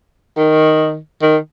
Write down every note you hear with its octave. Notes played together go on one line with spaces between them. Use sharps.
D#3
D#3